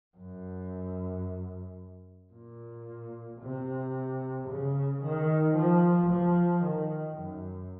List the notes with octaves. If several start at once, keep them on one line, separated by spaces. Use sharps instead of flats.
F#2
A#2
C3
C#3
D#3
F3
F3
D#3
F#2